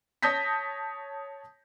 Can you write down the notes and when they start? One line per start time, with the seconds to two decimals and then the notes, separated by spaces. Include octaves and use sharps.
0.22 C#5 A5 D#6 G6 A#6 B6